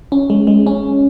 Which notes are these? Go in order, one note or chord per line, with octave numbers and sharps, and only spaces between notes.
C#4
G#3
G#3
C#4